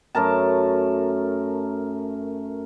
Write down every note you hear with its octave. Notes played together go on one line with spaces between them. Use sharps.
F#2 A3 A#4 A5